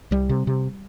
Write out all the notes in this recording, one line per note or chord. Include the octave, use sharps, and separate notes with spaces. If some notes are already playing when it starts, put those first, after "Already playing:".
C2 G3
C3
C3